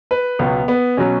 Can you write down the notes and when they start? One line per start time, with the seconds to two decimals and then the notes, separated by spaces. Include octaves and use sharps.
0.11 B4
0.39 C#2 B2 F#3 B3
0.68 B3
0.97 B2 F#3 C#4